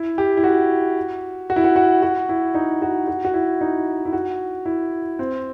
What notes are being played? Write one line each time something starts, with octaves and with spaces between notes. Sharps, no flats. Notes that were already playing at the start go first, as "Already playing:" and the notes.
Already playing: E4
G4
E4
F#4
F#4
E4
F#4
F#4
F#4
E4
D#4
F#4
F#4
F#4
E4
D#4
E4
F#4
E4
C4